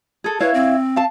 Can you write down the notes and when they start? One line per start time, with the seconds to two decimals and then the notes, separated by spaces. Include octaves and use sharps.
0.24 G#4 A4
0.40 E4 B4 C#5 F5
0.54 C4
0.96 F5 A5